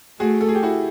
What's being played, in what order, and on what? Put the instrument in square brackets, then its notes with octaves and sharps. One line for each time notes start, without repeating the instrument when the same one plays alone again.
[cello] A3 [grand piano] F#4 G#4
[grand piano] A4
G#4
G4
E4 F#4